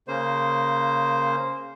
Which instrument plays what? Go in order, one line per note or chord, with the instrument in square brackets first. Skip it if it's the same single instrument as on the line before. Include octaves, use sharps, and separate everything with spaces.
[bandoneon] C#3 A#3 C5